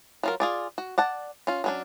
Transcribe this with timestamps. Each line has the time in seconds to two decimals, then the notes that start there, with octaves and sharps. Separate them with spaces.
0.23 F#3 F4 A#4
0.40 F4 G#4 D5
0.78 F#4
0.98 D5 F#5 A5
1.47 C#4 F4
1.64 F#3 C#4 D4